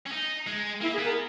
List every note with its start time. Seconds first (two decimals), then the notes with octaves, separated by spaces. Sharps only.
0.06 C#4
0.11 D#4
0.47 G#3
0.81 A#3 E4
0.93 G#4
0.98 B3
1.04 A#4